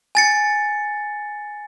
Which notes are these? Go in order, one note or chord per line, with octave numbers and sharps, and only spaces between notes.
G#5 A6 C#7